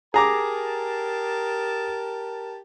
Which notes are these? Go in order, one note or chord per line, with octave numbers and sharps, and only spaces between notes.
G4 G#4 A#4 A5 A#5 D6